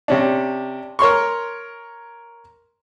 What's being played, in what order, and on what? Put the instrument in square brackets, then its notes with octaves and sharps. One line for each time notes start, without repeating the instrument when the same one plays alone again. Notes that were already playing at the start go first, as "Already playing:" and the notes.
[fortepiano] C3 C#4 D4
A#4 C#5 C6 C#6